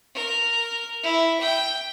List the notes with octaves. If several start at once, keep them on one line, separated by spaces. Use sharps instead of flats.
A#4
E4
G5